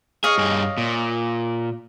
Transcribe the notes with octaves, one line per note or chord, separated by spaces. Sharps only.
G#4 C#5 D#5 F5
G2 G#4
A#2